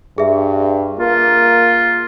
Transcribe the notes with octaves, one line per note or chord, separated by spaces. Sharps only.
G2 G#4 E5
A#3 F4